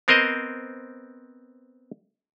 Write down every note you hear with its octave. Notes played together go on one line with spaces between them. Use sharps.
B3 C4 A#4 C5 D#5